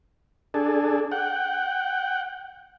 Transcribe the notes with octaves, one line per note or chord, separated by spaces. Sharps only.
D4 G#4 A4
F#5 G5